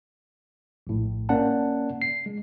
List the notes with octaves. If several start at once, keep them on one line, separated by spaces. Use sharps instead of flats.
A#1 A2
A#3 C#4 D5 F#5 A5
C7
G#3